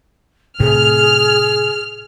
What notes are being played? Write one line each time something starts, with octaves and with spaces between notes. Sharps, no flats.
A2 C3 G#4 F6